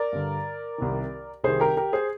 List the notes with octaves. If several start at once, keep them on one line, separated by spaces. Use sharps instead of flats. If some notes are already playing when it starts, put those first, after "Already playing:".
Already playing: A#4 D5
G2 D3
C2 C3 D#3
C2 C3 D#3 G#4 C5
G4 A#4
G4 A#4
G#4 C5